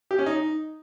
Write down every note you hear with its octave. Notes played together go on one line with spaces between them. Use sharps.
G4
C#4
D#4